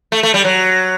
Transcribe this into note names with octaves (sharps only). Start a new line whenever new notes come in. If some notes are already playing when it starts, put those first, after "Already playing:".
A3
A3
G3
F#3